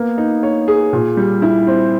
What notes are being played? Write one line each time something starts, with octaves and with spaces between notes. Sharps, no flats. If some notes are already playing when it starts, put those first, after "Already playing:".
Already playing: A#3 B3
D#4
C#5
G#4
A#2
G3
E4
C4